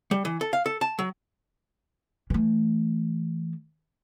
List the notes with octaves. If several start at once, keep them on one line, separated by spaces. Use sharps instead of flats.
G3
E3
A4
F5
A4
A5
F#3
E3 A3